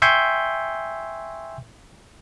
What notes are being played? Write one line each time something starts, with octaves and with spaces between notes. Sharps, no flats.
E5 G5 G#5 C6 C#6 G6